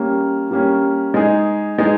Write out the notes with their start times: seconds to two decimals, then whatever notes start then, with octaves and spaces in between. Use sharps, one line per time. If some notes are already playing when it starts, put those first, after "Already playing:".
Already playing: G3 A#3 C#4
0.51 G3 A#3 C#4
1.14 G#3 D#4 G#4
1.78 G#3 D#4 G#4